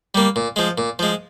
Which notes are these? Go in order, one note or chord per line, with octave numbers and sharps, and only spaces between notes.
G3 A#3
A#2
F3 G#3
A#2
F3 G#3